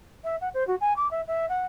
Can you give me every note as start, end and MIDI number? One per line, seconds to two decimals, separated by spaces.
0.24 0.36 76
0.41 0.49 78
0.54 0.66 72
0.67 0.75 66
0.80 0.93 80
0.96 1.09 86
1.11 1.21 76
1.28 1.46 76
1.49 1.66 78